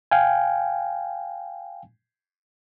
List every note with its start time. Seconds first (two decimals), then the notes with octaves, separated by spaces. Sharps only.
0.11 F5 G5 G#5